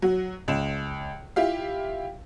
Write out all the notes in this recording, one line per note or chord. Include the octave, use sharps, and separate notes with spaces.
F#3 F#4
C#2 E7
E4 F4 G4 F5